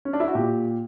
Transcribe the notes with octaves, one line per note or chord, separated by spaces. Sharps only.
C#4
D4
E4
F#4
A#2 G4